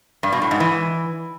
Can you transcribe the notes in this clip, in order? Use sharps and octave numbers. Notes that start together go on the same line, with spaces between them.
G2
B2
A2
G#2
E3